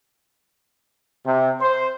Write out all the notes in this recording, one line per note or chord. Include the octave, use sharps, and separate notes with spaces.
C3
C5